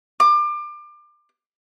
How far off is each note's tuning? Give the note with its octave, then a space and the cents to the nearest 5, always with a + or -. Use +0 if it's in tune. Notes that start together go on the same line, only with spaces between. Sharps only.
D6 +30